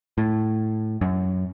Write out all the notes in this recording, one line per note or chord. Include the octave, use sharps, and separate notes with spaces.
A2
F#2